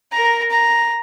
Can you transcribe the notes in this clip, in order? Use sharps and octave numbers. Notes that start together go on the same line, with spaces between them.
A#4 A#5
A#5